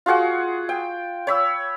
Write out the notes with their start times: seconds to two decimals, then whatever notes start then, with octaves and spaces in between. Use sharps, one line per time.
0.06 F4 F#4 G#4 F#5
0.69 G5
1.27 C#5 B5 E6